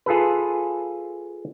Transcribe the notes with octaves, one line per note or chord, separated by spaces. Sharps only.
F4 G#4 A4 B4